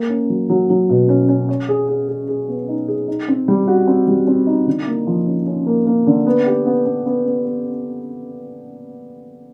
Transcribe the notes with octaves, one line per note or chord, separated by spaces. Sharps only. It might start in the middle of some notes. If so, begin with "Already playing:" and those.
Already playing: A#3
C#4
F#3
F#3
F#3
B2
C#4
C#4
C#5
G#4
G#4
G#4
G#4
B3
D#4
G#4
D#4
C4
G3
F#4
C4
G3
C4
D#4
D3
A#3
F3
C#4
C#4
A#3
A#3
D3
B3
G4
B3
B3
B3
B3
B3